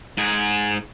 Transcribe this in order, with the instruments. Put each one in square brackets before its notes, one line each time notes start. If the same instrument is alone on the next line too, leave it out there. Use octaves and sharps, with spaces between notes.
[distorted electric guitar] G#2 G#4